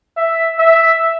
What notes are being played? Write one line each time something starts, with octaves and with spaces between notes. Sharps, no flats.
E5
E5